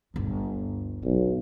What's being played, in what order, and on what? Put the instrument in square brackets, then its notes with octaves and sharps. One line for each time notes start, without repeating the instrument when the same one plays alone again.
[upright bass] G1 D2
[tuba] B1